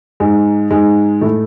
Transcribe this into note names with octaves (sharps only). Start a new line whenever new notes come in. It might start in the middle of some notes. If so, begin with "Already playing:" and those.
G#2 G#3
G#2 G#3
A2 A3